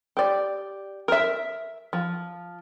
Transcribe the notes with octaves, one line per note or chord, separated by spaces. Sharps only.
G4 D5
A#4 E5
F3